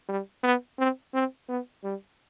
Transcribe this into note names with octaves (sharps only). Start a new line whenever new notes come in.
G3
B3
C4
C4
B3
G3